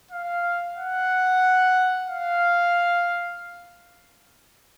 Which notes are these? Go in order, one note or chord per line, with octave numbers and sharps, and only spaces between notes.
F5
F#5
F5